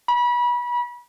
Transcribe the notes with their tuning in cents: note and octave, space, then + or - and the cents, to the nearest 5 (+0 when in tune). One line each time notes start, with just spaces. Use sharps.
B5 -30